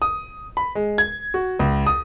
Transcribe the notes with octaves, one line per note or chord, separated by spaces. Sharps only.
D#6
B5
G#3
G#6
F#4
C#2
D#6